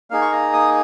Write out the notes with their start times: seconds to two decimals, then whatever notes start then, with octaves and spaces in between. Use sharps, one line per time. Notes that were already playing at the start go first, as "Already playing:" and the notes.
0.10 A#3 D#4 G#4 F5
0.22 C#6
0.32 A#5
0.53 D#6